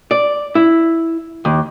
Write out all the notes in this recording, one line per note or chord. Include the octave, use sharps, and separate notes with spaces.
D5
E4
D#2